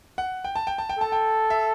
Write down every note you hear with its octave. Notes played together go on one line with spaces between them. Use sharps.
F#5
G5
A5
G5
A5
G5
A4 A5
G5
E5